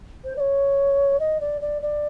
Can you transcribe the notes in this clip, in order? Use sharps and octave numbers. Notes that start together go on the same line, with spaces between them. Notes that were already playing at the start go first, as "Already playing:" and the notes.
C5
D5
C#5
D#5
D5
D5
D5